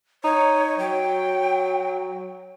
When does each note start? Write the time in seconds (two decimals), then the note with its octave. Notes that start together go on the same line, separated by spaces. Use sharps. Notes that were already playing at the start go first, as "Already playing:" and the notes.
0.24 D#4 C#5
0.79 F#3 G5